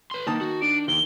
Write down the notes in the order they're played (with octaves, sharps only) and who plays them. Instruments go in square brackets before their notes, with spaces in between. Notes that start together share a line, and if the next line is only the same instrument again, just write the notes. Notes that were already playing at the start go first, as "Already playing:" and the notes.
[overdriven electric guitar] B4 C6
[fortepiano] D#3 A5 D#6 [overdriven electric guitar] A#3
[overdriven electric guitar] F#4
[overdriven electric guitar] D4 [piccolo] D7
[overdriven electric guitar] D#2 [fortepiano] D#3 [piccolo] G7